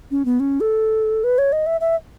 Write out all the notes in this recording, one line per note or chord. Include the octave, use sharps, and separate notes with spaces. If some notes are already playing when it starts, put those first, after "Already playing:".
C#4
B3
C#4
A4
B4
C#5
D#5
E5
E5